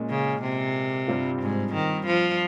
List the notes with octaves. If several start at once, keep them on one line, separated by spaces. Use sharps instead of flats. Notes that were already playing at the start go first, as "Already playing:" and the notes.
Already playing: A#2 G#3 C#4
C#3
C3
G2 G3 C4 F4
G#2
D#3
F3